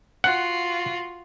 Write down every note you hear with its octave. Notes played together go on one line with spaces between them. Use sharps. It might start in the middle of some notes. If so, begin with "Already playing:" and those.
F4 F#4 F#5